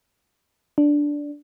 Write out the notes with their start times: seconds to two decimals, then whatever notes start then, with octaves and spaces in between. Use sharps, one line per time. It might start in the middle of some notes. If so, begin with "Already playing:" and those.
0.78 D4